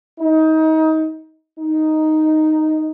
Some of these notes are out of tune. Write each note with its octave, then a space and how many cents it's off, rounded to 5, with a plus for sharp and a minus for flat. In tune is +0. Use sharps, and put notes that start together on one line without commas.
D#4 +25
D#4 +0